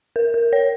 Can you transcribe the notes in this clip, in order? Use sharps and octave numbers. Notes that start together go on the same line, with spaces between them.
A#4
A#4
C#5